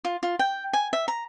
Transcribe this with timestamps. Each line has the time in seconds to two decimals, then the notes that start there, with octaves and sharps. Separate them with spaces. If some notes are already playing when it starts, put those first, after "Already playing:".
0.05 F4
0.23 F4
0.39 G5
0.73 G#5
0.93 E5
1.08 A#5